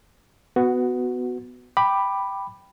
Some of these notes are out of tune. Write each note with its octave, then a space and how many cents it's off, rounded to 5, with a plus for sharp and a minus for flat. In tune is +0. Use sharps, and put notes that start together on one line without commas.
B3 +15 F#4 +0
G5 +0 B5 +0 D6 +15